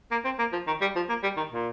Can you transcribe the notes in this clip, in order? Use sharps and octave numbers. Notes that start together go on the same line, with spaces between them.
A#3
C4
A#3
F3
D#3
G3
F3
A#3
G3
D#3
A#2